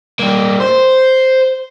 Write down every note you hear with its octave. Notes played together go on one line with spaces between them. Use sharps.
G3 A#3
C5